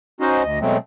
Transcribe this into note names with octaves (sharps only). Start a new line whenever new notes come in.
C#4 D#4 F#4 C5 D#5
D2 D#5
B2 F#3 G#3 A3 C4